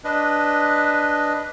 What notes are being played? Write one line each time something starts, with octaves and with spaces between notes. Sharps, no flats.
D4 B4 D#5